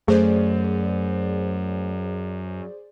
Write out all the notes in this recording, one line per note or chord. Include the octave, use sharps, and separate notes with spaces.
F#2 A3 G#4 C5 D5